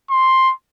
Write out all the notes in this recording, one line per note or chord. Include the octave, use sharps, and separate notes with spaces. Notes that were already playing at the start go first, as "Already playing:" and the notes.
C6